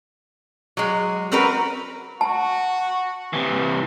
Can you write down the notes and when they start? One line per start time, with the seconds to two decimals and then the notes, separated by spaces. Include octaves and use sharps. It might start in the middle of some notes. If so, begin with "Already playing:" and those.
0.77 F#3 G#3
1.32 C4 C#4 F#4 A#4 B4
2.21 F#4 A5
3.33 C3 E3